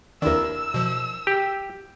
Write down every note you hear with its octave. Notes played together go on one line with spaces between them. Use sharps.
D#2 D#3 D4 E4 A#4 E6
B2 F3
G4